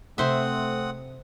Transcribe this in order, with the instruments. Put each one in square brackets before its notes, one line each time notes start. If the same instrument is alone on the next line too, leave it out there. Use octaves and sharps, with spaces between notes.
[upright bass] C3 [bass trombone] A3 [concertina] C4 F#5 D#6 [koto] C5 E5